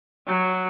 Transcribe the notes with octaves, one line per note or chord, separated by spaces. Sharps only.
F#3